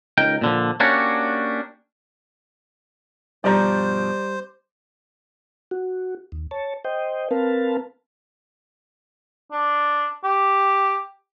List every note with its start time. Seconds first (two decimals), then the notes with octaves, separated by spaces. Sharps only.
0.18 C#2 D#4 A#4 G5
0.41 A#2 D3 F3
0.80 A#3 C#4 D4 F#4 G4 C#5
3.44 G2 B2 F3 G3 C5 D5 A#5
5.71 F#4
6.32 D#2
6.51 C#5 A5
6.85 C5 D#5 G5
7.31 C4 A#4 B4 F5 A5
9.52 D4
10.24 G4